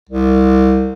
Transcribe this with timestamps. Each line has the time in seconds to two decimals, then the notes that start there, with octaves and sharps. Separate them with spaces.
0.09 C2